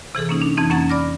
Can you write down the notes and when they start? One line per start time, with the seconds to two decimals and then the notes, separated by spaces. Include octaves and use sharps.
0.15 C3 E3 G#4 A4
0.29 A#3 C#4 D#4
0.42 D4
0.57 F2 E3 C4 D#4
0.70 F2 A#3 C#4 F#5 A#5 A6
0.90 D5 B5 D6 F6 A#6